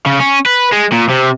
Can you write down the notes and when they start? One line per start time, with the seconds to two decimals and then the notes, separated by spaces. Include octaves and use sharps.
0.06 C#3
0.20 C#4
0.46 B4
0.73 G#3
0.92 A#2
1.10 C3